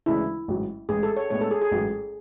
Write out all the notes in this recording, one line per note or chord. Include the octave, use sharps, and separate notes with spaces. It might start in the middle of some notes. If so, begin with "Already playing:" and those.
D2 C#3 E3 G#3 D4 E4
A1 G#2 F#3
A1 G#2 G#3 G#4
A4
C#5
A2 G#3 B3 D4 C#5
A4
G#4
G#4
A1 G#2 F#3